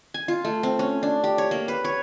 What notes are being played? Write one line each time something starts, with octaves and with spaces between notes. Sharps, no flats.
G#5
F4
A3
C4
C#4
D4
G4
C#5
A#3
B4
C#5